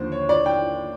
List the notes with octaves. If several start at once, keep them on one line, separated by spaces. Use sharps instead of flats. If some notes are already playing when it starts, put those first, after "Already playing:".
Already playing: D#2 D3 F3 C5
C#5
D5
G5